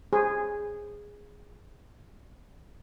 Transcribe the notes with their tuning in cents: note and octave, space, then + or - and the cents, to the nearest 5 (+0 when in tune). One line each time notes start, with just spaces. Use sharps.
G#4 -5 C5 +0